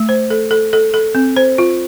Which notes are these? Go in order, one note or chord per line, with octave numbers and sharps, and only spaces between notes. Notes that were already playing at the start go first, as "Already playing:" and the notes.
Already playing: A3
C5
A4
A4
A4
A4
C4
C5
F4